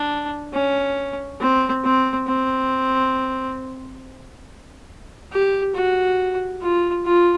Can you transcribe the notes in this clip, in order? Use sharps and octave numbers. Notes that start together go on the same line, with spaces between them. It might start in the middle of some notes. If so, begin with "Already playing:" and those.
Already playing: D4
C#4
C4
C4
C4
G4
F#4
F4
F4